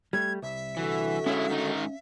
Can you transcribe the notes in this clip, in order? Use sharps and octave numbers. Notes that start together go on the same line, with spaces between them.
G3 A3 G#6
C2 E5
D3 E3 F#4
G#3 C#4 E4 F5
G#2 D#3 D#4